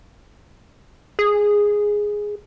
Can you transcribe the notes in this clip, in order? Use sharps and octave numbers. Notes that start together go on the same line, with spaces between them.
G#4